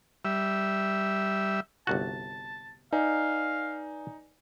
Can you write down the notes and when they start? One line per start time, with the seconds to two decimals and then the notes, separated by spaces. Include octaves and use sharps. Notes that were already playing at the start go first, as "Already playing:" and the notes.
0.25 G3 E5
1.87 G1 C2 F#4 A5
2.93 D#4 B4 D5 F5 G#5